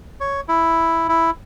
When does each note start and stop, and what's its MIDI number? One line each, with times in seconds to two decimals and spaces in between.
0.20 0.41 73
0.48 1.07 64
1.09 1.30 64